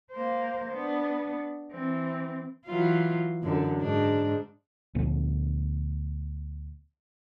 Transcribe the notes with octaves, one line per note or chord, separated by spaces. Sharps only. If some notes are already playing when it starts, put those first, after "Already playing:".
A#3 C5
B3 D4
E3 C4
E3 F#3 F4
F#2 D3
G#2 D4
D2 A#2 F3 B3